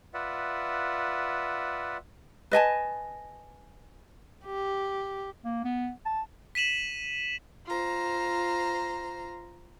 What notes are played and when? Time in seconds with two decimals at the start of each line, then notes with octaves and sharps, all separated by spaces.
0.14 F4 B4 D5 E5 F#5
2.52 B4 D#5 G#5 A5
4.45 G4
5.45 A#3
5.64 B3
6.06 A5
6.55 B6 D#7 E7 F#7
7.67 F4 C5 A#5